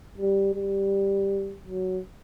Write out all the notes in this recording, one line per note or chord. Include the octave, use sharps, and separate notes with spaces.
G3
G3
F#3